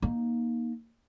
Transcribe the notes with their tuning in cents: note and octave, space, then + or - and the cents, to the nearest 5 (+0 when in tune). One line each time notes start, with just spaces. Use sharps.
A#3 +20 D#4 +0